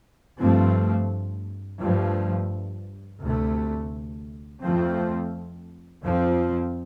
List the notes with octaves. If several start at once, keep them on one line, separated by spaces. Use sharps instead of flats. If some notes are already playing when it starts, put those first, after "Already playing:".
G2 F3 A3 C4
G2 F3 A3
D2 C3 A3
F2 F3 A3 C4
F2 F3 C4